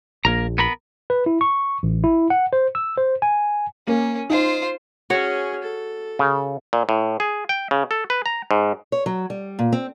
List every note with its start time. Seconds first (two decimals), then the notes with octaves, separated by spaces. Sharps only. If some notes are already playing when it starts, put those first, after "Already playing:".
0.25 A#1 A#3 A#4 A#5
0.58 B3 A#4 B5
1.10 B4
1.26 E4
1.41 C#6
1.83 A1
2.04 E4
2.30 F#5
2.53 C5
2.75 E6
2.97 C5
3.22 G#5
3.87 A#3 C#4
4.30 D#4 F4 C5
5.10 C#4 F#4 G#4 C#5
5.62 A4
6.19 C#3
6.73 A#2
6.89 A2
7.20 G#4
7.49 G5
7.71 C#3
7.91 A4
8.10 B4
8.26 A#5
8.51 G#2
8.92 C#5
9.06 F#3
9.30 G3
9.59 A#2
9.72 C4